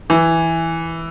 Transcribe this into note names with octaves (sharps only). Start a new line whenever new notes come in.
E3